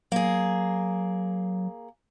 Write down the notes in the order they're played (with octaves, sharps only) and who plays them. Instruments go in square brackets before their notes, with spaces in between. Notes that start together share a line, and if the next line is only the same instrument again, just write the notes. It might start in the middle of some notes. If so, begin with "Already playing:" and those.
[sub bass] F#3 [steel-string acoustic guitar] A#3 G#4